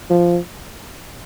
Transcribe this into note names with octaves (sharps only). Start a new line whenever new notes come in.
F3